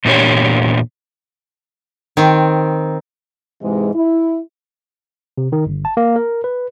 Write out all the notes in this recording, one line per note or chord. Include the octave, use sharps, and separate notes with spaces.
E2 A#2 D4 G4 C#5
D#3 C4
G#2 C3 E3 G#3
E4
C3
D#3
G1
A5
A#3
A#4
B4